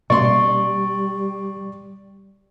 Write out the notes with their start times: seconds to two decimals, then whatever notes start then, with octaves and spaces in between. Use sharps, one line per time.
0.10 B2 G3 A#3 C#4 D5 C6 C#6